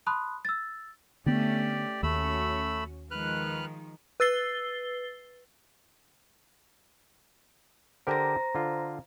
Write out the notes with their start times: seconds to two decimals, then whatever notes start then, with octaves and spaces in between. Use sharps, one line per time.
0.07 A5 B5 C6 D#6 F#6
0.45 E6 A6
1.26 D3 A3 B3 C#4 G4 D5
2.03 D#2 A3 C#4 F#4 B5 E6
3.11 D#3 F3 G#3 B4 F6 F#6
4.20 B4 E6 A6 C7 G7
8.07 D3 G4 A#4 C5 A#5 A#6
8.55 D3 F4